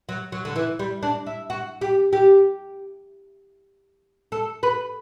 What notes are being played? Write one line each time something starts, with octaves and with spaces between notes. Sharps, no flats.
F#3
F#3
D3
E3
G3
D4
E4
F#4
G4
G4
A4
B4